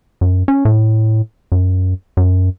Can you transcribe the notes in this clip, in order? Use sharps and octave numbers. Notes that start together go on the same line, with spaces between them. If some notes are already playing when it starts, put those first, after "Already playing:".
F#2
C#4
A2
F#2
F#2